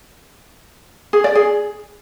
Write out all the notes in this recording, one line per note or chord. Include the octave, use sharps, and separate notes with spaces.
G#4
D5
G#4